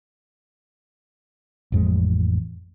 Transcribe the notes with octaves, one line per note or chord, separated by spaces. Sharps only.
A1 F2 G#3